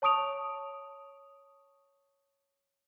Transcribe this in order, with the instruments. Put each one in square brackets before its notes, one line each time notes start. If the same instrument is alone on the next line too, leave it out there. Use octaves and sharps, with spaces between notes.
[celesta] C#5 A5 C#6 D#6 D7 F7